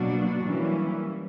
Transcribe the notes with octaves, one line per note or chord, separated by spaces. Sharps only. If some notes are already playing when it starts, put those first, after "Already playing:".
Already playing: B2 F#3 A#3 D4 F#4
E3 G3 A#3 C#4